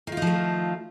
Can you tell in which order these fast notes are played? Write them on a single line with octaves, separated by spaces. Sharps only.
D#3 F4 D#4 F3 A3